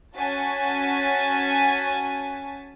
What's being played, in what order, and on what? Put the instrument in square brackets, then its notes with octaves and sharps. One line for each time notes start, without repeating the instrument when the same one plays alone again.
[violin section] C#4 F#4 G#5 A5 B6